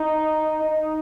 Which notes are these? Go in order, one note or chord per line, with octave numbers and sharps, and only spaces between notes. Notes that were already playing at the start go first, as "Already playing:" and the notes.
Already playing: D#4
D#4